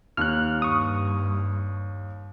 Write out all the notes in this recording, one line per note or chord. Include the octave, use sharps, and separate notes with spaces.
D#2 F6 F#6
G2 C#6 D#6